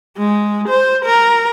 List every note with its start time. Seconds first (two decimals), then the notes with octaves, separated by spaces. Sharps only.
0.18 G#3
0.69 C5
1.05 A#4